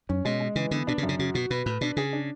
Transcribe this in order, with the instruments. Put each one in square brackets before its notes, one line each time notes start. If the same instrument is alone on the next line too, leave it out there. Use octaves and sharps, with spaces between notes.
[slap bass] F#2 [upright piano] C#4
[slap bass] B2 [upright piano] G#3
[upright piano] G#3
[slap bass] C#3 [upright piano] E3
[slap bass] D3 [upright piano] B3
[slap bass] B2 [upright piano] D4
[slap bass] C#3
[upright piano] F#2
[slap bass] C#3
[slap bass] C#3 [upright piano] F#4
[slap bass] B2 [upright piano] F#4
[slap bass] B2 [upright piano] B4
[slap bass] A2 [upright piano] B4
[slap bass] B2 [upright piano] D4
[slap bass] C#3 [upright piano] G#4
[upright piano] D4